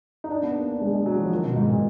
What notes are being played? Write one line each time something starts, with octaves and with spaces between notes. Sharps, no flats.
D#4
D4
B3
A#3
D4
G#3
G#3
F#3
F3
D#3
B2
G#2
A#2